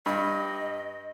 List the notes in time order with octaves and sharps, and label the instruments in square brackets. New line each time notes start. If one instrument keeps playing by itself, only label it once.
[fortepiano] G2 [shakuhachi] D#5